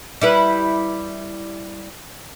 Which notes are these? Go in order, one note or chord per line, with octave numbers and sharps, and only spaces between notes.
G3 E4 B4